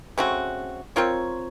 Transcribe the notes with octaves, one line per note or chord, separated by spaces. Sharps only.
C#3 A3 C4 F#4
C4 F4 A#4 C#5